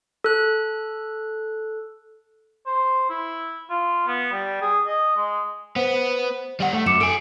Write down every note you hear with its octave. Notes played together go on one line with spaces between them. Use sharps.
A4 F#6
C5
E4
F4
B3
G3
G#4
D#5
G#3
B3 C5
G3 F#5
A3
F#2 D6 C#7 E7
A4 G#5 D7